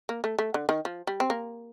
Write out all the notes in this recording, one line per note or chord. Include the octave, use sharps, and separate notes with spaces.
A#3
A3
A3
D3
D#3
F3
G3
C4
A#3